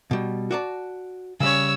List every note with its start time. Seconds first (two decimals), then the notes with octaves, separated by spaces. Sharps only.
0.11 B2 G3
0.51 F#4 D5 A5
1.40 C#3 G3 C#5 E6